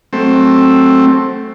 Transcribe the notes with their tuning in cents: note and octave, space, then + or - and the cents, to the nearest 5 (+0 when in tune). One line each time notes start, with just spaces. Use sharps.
F#3 +15 A3 +0 C4 +15